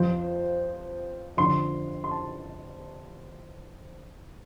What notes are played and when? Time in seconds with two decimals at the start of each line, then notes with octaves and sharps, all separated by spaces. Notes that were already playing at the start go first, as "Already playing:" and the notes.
Already playing: F2 F3 C5
1.37 F2 D3 F3 C6
2.04 C6
2.11 A5